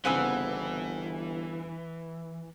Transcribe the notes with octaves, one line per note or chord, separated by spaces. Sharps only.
G1 C#3 E3 B3 C4 F#5 G#5 E6